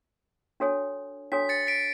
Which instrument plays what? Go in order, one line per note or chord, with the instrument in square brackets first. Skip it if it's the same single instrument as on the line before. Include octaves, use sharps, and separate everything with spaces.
[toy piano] D4 F#4 A4 C#5 G#5
[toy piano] D4 F#4 A4 C#5 G#5 [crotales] B6
[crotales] A6 C#7
B6 D7